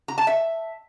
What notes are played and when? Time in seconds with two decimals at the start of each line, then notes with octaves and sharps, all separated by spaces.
0.08 A#5
0.18 A5
0.27 E5